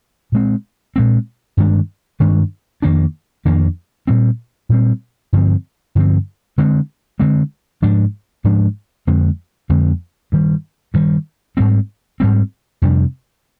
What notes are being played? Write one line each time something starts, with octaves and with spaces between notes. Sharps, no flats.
A#2 G#3 C4
A#2 G#3 C4
G2 D#3 G#3 D4
G2 D#3 G#3 D4
F2 D#3 A#3 D4
F2 D#3 A#3 D4
A#2 G3 C4
A#2 G3 C4
G2 D3 F3 C4
G2 D3 F3 C4
D3 G#3 C4
D3 G#3 C4
G#2 F3 G#3 D4
G#2 F3 G#3 D4
F2 D3 G#3 C4
F2 D3 G#3 C4
G2 D#3 G3
G2 D#3 G3
G#2 G3 C4
G#2 G3 C4
F2 C3 G3 D4